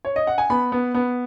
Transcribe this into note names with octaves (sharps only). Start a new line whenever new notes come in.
C#5
D#5
F#5
G#5
B3 B5
B3
B3